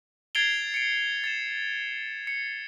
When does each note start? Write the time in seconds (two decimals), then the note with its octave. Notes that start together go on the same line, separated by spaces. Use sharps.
0.35 G#6 A6 C7 D7 F7 G7
0.74 C#7 D7
1.24 A6 C#7 E7
2.27 C#7